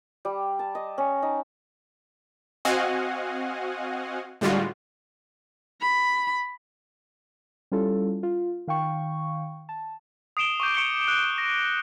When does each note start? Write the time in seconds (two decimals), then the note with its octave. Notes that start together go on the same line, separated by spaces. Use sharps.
0.25 G3
0.59 A5
0.75 D#5
0.98 C#4
1.22 D#4
2.65 C4 F#4 D#5 F5 F#5 G#5
4.41 A2 D3 G3 G#3 F4 F#4
5.82 B5
7.72 G3 C#4 E4 F4 A4
8.23 F4
8.68 D#3 F5 G5 C#6
9.69 A5
10.37 D#6 C7 D7 E7 G7
10.60 C#6 D6 G6
10.75 C#6 C#7 D7 G7
11.08 F#6 D#7
11.38 A#6